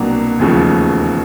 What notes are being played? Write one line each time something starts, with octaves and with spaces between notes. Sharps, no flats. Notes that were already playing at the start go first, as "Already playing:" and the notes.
Already playing: C2 B2 F#3 A#3 D4
E1 D#2 C#3 F3 A3